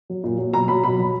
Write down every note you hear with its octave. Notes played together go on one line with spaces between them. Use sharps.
F#3
A#2
F#3
B2 A#5
F#3 B5
B2 B5
F#3